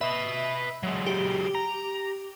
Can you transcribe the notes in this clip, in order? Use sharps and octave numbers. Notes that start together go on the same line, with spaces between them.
B4 D#5 E5
F#3 G#3
G4
A#5